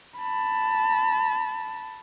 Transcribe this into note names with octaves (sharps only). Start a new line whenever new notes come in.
A5 B5